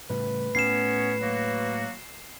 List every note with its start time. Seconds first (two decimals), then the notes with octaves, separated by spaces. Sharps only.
0.10 A2 C#3 G3 B4
0.55 A2 B3 C#4 C#5 C7 E7
1.20 F#3 A#3 F#4